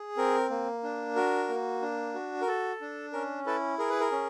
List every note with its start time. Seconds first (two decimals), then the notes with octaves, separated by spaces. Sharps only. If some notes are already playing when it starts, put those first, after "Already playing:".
Already playing: G#4
0.17 C4 A#4
0.50 A#3
0.83 D4
1.16 F#4 A#4
1.48 A#3
1.82 D4
2.14 F#4
2.41 A#4
2.47 A4
2.81 D4
3.13 C#4 A#4
3.46 E4 A4 B4
3.79 G#4 A#4
3.90 B4
4.00 A#4
4.11 C#4